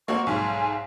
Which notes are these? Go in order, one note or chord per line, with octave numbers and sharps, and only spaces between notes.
A#3 C4 F#4 C#6
B1 G#2 G#5